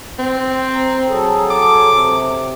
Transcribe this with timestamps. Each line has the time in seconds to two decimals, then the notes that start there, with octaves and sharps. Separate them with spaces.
0.19 C4
0.74 A#5
1.08 F#3 G#4 A4
1.50 D6
1.90 C3